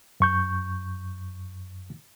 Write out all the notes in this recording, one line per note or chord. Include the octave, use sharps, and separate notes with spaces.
F#2 C#6 G6